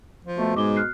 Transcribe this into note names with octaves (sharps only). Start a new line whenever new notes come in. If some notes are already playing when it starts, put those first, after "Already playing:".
F3
B2 A3
G#2 G#3 D6 G7
F6 F#6 C7